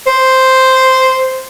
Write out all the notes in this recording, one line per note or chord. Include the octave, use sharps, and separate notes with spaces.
C5